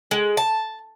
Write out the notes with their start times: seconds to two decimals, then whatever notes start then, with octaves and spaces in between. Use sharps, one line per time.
0.11 G#3
0.37 A5